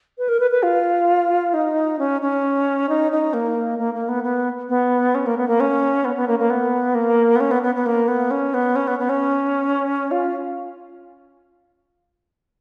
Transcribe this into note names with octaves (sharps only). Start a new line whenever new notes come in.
B4
A#4
B4
B4
F4
D#4
C#4
C#4
D#4
D#4
A#3
A#3
A#3
B3
B3
B3
C#4
A#3
B3
A#3
C#4
B3
B3
A#3
A#3
B3
A#3
B3
C#4
B3
B3
B3
A#3
B3
C#4
B3
C#4
B3
B3
C#4
F4